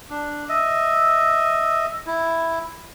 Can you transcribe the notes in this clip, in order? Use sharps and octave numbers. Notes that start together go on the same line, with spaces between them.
D4
D#5 E5
E4